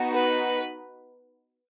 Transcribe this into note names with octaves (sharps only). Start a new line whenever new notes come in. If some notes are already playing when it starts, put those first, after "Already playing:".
Already playing: B3 D#4 F#4
B4